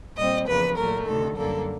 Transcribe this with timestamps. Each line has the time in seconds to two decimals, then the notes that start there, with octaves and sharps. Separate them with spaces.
0.17 A#2 G3 C4 D#5
0.47 E2 C#3 F3 A#3 B4
0.77 A#2 F#3 A3 A#4
1.06 D2 C3 D#3 A4
1.36 F#2 D3 G3 A#3 A4